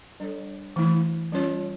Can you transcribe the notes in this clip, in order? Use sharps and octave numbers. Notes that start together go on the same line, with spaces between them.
G3 D4 A4 C#5
E3 A3 E4
G3 C#4 F4 C#5